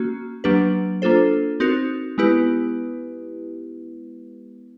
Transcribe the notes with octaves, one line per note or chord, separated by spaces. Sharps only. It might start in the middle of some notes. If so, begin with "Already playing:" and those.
Already playing: A#3 C#4 F#4
F#3 A#3 D4 G4 B4
A#3 D4 F4 A4 C5
C4 D#4 F#4 A#4
G#3 B3 E4 G4 B4